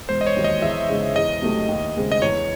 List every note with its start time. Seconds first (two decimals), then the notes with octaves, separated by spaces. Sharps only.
0.09 E1 C5
0.21 D#5
0.27 C#5
0.36 D#2 D#3 F#3
0.44 D#5
0.62 E2 E5
0.88 C#3 G#3 D#4
1.15 E2 D#5
1.42 C3 F#3 A3 D#4
1.69 D#2
1.96 C#3 G#3 C4
2.12 D#5
2.22 E2 C#5